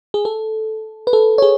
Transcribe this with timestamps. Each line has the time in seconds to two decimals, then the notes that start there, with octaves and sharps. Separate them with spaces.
0.14 G#4
0.25 A4
1.07 B4
1.13 A4
1.38 C#5
1.42 G#4